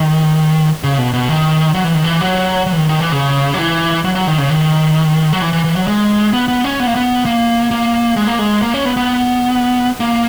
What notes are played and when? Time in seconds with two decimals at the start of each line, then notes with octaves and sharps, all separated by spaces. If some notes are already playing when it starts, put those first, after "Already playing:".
Already playing: D#3
0.84 C#3
0.98 B2
1.13 B2
1.29 D#3
1.74 F#3
1.84 E3
1.95 D#3
2.04 E3
2.21 F#3
2.67 F#3
2.72 E3
2.78 D#3
2.89 D#3
3.00 E3
3.12 C#3
3.54 F#3
3.58 E3
4.04 F#3
4.15 F#3
4.27 D#3
4.38 C#3
4.50 D#3
5.33 F#3
5.42 E3
5.53 E3
5.64 E3
5.76 F#3
5.88 G#3
6.33 B3
6.48 B3
6.64 C#4
6.80 B3
6.87 A#3
6.96 B3
7.25 A#3
7.71 A#3
8.16 G#3
8.27 A#3
8.39 G#3
8.62 A#3
8.74 C#4
8.85 B3
8.97 B3
10.00 A#3